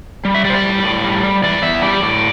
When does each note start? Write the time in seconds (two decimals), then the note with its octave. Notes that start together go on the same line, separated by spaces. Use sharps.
0.25 G3
0.35 E5
0.45 G3 D5
0.50 C5
0.55 D5
0.64 A2
0.83 A2
1.04 G3
1.23 G3
1.43 E3 D5
1.62 E2 E5
1.82 G3 D5
2.02 A2